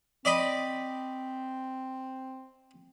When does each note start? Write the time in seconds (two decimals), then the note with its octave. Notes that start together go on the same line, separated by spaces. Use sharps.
0.25 C4 D5 D#5 B5